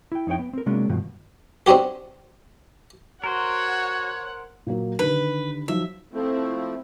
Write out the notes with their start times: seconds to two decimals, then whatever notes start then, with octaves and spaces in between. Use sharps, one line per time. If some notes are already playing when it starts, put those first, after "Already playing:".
0.12 E4 G5
0.27 F2 D#4 E4 C#5 G5
0.39 B3
0.53 C4 A#4
0.66 C3 F#3 G#3 A#3 C#4 D4
0.89 G2 B2 D#3 F3
1.66 C4 D4 D#4 F#4 G4
3.24 F#4 A#4 C5 C#5 F#5
4.67 A#2 F#3 A#3
4.99 D3 D#3 G4 B4
5.68 F3 F#3 D#4 E5
6.14 F3 A3 C4 E4